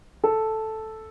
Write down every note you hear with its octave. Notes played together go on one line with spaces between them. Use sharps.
A4